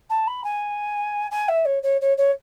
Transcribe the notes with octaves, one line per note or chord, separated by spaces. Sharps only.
A5
B5
G#5
G#5
E5
C#5
C#5
C#5
C#5